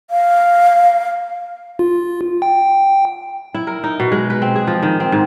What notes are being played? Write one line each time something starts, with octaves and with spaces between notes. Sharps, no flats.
F5
F4
G5
E4
A#4
D#4
B2
G#3
B4
C4
G#4
F3
D#3
C4
G#2